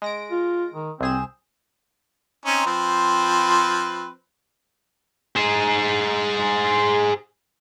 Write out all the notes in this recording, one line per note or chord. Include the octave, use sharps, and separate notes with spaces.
G#3 A#6 D7
F4
D#3
C2 C4 G#4 E7
C4 C#4 D#4
F3 C4 B4
G#4 C5